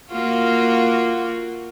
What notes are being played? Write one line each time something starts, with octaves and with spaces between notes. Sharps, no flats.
A#3 F4 F#4